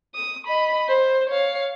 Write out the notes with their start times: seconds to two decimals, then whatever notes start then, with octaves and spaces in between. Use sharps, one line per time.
0.15 D#6
0.47 D#5 B5
0.89 C5
1.30 C#5 F5